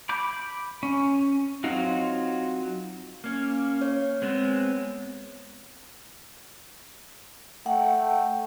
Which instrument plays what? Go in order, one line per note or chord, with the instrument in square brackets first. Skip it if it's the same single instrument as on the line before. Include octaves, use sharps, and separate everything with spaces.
[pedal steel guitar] B5 D6 G6
C#4
F#3 C4 D#4 F4 F#4
[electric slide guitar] A#3 C#4
[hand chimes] C#5
[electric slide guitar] G#3 B3 C4
[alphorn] A3 [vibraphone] F#5 [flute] G5